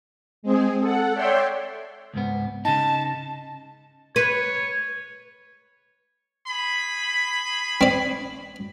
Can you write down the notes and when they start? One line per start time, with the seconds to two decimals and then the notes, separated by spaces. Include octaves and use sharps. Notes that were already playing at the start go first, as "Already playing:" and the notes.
0.43 G#3 C4 G#4
0.80 A4 F#5
1.14 C#5 D5 E5 G5 C6
2.14 C#2 G#2 B3
2.65 C#3 D#4 A5
4.16 B4 C#5
6.48 G#4 B5
7.81 C4 D5